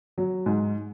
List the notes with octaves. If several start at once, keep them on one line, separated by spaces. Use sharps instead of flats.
F#3
G#2